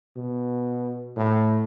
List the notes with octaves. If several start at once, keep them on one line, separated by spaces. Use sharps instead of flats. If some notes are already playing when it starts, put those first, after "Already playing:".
B2
A2